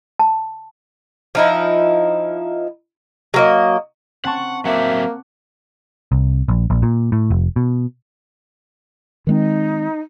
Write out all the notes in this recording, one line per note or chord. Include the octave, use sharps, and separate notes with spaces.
A5
F3 D#4 E4
F#3 A#3 D#5
C4 F#5 A5 C#6
F#3 A#3 C4 E5 F#5 D6
C2
A#1
A#1
A#2
A2
F1
B2
D#3 G#3 C4 D#4